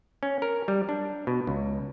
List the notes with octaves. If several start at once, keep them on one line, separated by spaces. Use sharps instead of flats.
C#4
A#4
G3
D4
B2
C#2